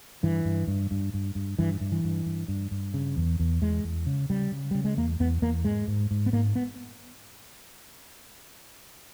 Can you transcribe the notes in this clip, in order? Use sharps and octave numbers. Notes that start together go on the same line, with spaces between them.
G2 E3
G2
G2
G2
G2
G2
G2 E3
G2
E3
G2
G2
G2
G2
C#3
E2
E2
E2 G#3
E2
C#3
C#3 G3
C#3
C#3 G3
G#3
E2 A#3
E2 B3
E2 A#3
G#2 G#3
G#2
G#2
B3
G#2 A#3
B3